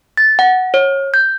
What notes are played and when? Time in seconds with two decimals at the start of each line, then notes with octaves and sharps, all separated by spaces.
0.17 A6
0.39 F#5
0.74 C#5
1.14 G6